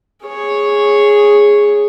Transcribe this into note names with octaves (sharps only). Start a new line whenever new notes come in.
G#4 C#5